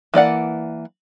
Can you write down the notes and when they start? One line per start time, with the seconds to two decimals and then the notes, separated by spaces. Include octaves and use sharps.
0.14 E3 A#3 D5 F#5